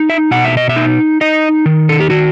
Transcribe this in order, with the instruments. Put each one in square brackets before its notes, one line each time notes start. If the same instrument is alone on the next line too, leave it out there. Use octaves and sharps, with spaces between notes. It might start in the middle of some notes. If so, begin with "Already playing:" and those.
Already playing: [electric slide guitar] D#4
E5
B2 F#5
E5
D#5
E5
D#4
D#4 D#5
D#3
A4
G4
D#3 F#4